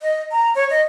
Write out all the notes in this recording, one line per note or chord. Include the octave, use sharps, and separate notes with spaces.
D#5
A#5
C#5
D#5